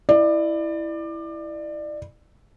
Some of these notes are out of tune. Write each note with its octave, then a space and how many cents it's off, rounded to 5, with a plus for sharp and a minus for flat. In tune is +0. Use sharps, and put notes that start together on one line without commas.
E4 +0 D5 +25